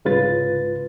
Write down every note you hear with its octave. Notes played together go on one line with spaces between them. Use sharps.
C2 G#2 C#3 F4 B4 A6